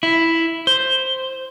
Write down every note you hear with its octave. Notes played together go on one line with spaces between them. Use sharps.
E4
C5